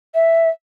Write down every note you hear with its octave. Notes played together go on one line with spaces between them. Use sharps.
E5